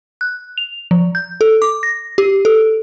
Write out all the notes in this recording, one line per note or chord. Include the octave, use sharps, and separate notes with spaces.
F#6
F7
F3
G6
A4
D6
A#6
G4
A4